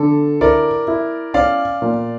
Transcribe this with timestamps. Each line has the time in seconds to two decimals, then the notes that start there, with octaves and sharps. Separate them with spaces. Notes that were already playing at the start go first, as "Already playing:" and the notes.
Already playing: D3 A4
0.41 E4 A#4 D5
0.88 E4
1.34 C#4 D5 F5
1.82 A#2